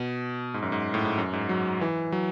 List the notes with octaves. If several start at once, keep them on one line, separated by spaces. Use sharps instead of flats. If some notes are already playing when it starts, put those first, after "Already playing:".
Already playing: B2
G#2
F#2
G#2
A2
G#2
F#2
G#2
F#3
E3
F#3